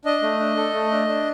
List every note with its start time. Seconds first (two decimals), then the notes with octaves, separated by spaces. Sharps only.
0.05 D4 D#5
0.22 A3
0.40 D4
0.56 A4
0.74 A3
0.91 D4
1.08 D4